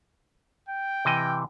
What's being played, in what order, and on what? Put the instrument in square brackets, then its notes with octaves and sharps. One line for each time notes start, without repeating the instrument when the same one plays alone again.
[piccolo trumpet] G5
[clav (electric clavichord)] C3 E3 D#5